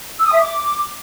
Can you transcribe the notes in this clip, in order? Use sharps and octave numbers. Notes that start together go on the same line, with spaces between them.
E6
D#6
E5
D6